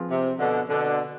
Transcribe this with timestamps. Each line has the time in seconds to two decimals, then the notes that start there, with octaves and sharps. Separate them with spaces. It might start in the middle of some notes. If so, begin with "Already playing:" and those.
Already playing: F3 C4 F4 G#4 B4
0.10 C3
0.39 B2 D3
0.69 B2 D3